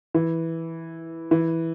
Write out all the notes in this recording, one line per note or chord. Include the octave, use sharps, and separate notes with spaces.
E3
E3